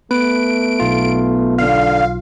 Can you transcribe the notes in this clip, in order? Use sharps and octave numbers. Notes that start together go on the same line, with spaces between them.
A3 B3 B4 D7
B1 F4
D3 F5